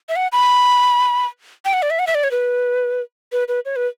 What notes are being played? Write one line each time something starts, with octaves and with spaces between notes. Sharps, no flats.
E5
F#5
B5
G5
F#5
D5
E5
F#5
E5
D5
C#5
B4
B4
B4
C#5
B4